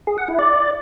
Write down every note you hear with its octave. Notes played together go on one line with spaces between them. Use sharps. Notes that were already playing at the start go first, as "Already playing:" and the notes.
G#4
F#5
E4
D5